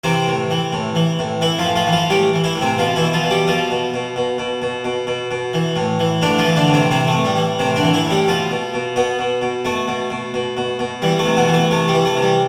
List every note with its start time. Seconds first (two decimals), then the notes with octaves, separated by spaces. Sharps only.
0.04 C3 E3 C4
0.27 A2
0.50 E3
0.73 A2
0.95 E3
1.19 A2
1.41 E3 E4
1.58 F3 F4
1.65 A2
1.76 F3 F4
1.87 E3
1.92 F3 F4
2.10 A2 G3 G4
2.34 E3
2.44 E3 E4
2.56 A2
2.61 C3 C4
2.78 B2 F3 F4
2.96 B2 E3 E4
3.13 F3 F4
3.24 B2
3.30 G3 G4
3.47 B2 F3 F4
3.70 B2
3.94 B2
4.16 B2
4.38 B2
4.62 B2
4.84 B2
5.07 B2
5.31 B2
5.53 E3
5.76 A2
5.99 E3
6.22 A2 D3 D4
6.38 F3 F4
6.45 E3
6.56 D3 D4
6.68 A2
6.73 C3 C4
6.91 C3 E3 C4
7.07 A3
7.13 A2
7.25 G3
7.36 E3
7.59 A2 C3 C4
7.76 D3 D4
7.83 E3
7.93 E3 E4
8.05 A2
8.10 G3 G4
8.28 B2 F3 F4
8.51 B2
8.74 B2
8.96 B2 B3
9.19 B2
9.42 B2
9.65 B2 A3
9.88 B2
10.10 B2
10.34 B2
10.57 B2
10.79 B2
11.02 E3 G3
11.19 A3
11.26 C3
11.37 B2 B3
11.47 E3
11.53 A3
11.71 C3 A3
11.88 G3
11.94 E3
12.05 A3
12.17 C3
12.23 G3